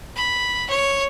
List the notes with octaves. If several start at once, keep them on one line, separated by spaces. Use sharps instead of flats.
B5
C#5